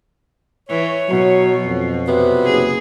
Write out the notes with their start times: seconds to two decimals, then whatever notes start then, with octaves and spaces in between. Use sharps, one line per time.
0.70 E3 C#5
1.09 B2 F#3
1.65 F2
2.07 C3 F#3 B3
2.46 F#1 G#4